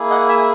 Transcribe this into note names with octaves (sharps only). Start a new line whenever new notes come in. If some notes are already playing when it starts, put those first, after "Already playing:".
Already playing: A#3 E4 G#4
D#5 F#5
E5 G#5